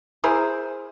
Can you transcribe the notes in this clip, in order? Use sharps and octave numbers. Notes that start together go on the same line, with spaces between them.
E4 G#4 A#4 C5